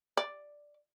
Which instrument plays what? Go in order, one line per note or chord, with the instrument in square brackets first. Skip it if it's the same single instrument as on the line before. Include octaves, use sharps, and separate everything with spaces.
[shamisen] D5